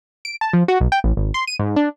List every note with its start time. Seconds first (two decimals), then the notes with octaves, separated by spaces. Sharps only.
0.25 D7
0.41 A5
0.53 F3
0.68 F#4
0.81 B1
0.92 G5
1.04 A1
1.17 G#1
1.34 C6
1.47 D#7
1.59 G#2
1.76 D4